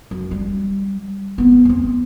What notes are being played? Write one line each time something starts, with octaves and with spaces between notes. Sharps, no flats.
F#2
G3
B3 C4
E2 C4